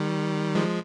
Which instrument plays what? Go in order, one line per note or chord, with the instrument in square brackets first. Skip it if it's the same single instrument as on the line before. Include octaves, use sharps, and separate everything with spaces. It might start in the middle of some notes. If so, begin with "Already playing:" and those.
Already playing: [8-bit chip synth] D#3 G3
F3 G#3